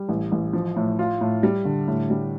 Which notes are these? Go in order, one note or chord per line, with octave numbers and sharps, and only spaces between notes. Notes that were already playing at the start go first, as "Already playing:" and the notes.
Already playing: G3
A1
A1
F3
A2
F4
A2
G3
D3
A2
G3